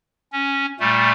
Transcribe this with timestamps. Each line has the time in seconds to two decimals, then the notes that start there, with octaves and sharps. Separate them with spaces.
0.33 C#4
0.80 A#2 G3 A3